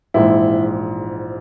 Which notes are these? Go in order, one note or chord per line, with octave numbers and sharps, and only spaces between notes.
A#1 G#2 E3 E4